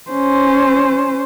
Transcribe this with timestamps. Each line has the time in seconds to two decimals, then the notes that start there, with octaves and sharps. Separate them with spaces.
0.11 C#4 C5